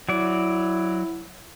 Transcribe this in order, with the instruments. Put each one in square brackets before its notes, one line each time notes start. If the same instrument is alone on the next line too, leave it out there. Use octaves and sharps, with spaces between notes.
[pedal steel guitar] F#3 D5 [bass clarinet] E4